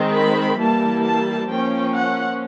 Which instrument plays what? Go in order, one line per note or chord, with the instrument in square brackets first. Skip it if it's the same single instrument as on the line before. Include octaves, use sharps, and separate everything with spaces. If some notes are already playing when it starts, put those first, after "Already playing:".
Already playing: [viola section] D#3 G#3 C4
B5
E3 G3 A#3 A5
A5
F3 A#3 C#4 G5
F#5